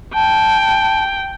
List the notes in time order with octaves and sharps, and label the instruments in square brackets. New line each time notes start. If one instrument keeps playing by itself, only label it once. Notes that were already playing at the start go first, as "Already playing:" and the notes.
[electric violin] G5 [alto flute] A5